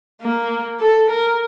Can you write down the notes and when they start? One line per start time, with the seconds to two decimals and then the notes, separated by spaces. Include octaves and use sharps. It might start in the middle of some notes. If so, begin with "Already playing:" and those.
0.22 A#3
0.80 A4
1.10 A#4